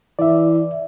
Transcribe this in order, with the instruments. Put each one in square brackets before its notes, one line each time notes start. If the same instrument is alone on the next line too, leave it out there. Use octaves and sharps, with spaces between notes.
[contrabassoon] E3 [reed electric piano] D5 E5